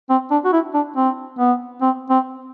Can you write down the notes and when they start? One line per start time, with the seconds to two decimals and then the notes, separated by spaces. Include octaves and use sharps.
0.10 C4
0.31 D4
0.45 F#4
0.53 E4
0.74 D4
0.96 C4
1.39 B3
1.81 C4
2.10 C4